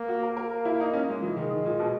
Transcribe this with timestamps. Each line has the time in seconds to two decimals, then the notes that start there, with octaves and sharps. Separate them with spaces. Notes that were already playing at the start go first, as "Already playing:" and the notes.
Already playing: A#3
0.08 F#4
0.23 A#4
0.37 A#3 A#4
0.65 E4
0.80 D#4
0.94 C#4
1.09 G#3
1.22 E3 G#3
1.36 D#3
1.51 D#3
1.65 A#2
1.79 B2